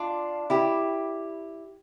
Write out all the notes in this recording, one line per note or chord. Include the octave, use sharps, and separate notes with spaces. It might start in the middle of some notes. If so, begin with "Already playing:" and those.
Already playing: D4 F4
E4 G4